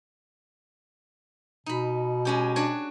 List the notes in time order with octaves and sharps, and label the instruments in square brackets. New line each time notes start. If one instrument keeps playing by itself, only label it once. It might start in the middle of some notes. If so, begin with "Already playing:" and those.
[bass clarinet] B2 [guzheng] D#4 B5
[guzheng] G#3 C#4 G4
D4 F#4 C#5